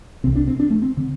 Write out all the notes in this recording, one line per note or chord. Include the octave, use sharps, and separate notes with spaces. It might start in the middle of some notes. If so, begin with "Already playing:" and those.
C2 C3 C4
D4
C4
D4
A3
C4
D3